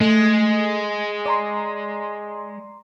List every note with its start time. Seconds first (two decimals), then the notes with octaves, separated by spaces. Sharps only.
0.01 G#3 A3
1.26 D5 A#5 C6